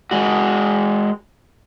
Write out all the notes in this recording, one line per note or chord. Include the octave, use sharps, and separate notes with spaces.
G#3 F#4